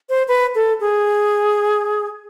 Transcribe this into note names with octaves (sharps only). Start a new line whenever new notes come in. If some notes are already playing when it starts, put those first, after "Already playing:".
C5
B4
A4
G#4